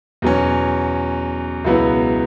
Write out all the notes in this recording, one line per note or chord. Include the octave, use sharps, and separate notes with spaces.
E2 B2 F#3 C#4
C#2 B2 F#3 B3 E4